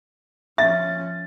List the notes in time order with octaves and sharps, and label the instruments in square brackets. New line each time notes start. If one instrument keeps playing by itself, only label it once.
[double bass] F3 C#4 [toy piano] E5 [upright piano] A6